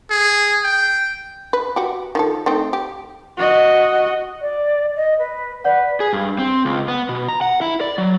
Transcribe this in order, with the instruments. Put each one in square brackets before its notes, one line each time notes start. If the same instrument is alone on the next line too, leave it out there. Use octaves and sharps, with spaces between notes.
[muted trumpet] G#4
G5
[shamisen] B4
F#4 G4
D#3 F3 A4
A3 C4 D#4
G4
[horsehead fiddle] F#4 D#5
[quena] D5
D#5
B4
[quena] B4 [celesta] D5 F#5
[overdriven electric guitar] G#4
G2
C4
C#2
B3
B2
A#5
F#5
E4
D5
F#3